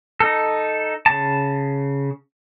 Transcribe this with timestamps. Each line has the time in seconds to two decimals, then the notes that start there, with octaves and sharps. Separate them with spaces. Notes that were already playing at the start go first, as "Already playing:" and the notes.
0.20 D#4 A4
1.06 C#3 A5